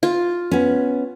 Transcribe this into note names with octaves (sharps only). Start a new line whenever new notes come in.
F4
B3 C#4